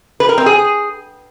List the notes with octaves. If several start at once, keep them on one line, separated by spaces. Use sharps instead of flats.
B4
A#4
C4
G#4